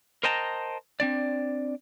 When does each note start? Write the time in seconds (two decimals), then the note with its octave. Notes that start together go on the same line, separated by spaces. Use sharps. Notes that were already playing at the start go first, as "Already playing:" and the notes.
0.23 A#4 C5 D#5 G5 A5 A#5
1.00 C4 D4 D5